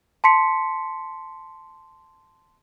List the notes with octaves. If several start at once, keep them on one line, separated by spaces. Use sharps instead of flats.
A5 C6 B6 C#7